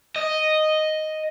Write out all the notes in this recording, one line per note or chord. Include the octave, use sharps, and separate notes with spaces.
D#5